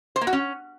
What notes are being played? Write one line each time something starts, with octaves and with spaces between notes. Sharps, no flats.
C5
A#3
F#4
C#4